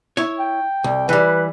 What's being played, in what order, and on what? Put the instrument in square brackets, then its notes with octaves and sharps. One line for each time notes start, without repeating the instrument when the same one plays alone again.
[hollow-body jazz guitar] E4 C#5
[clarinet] G5
[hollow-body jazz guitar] C2
[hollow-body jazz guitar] E3 G3 [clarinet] B4